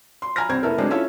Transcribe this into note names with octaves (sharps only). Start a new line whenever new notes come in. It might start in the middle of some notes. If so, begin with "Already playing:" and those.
C6
G#5 A#5 B5 F6 A#6
C2 C4 G#6
F#1 B3 E4 A4 A#4
F#3 G#3 A3 C4 D4
C#4 E4 F4 A4 C#5 E5